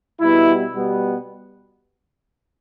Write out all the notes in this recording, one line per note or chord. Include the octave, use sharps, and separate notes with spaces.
B2 G3 B3 E4
B2 G3 B3